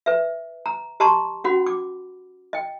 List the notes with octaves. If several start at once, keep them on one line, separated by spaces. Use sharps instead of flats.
B4 E5
A#5
G4 D#5 A5 A#5 C6 C#6
C#4 F#4 F#5 B5
D6
D#5 G5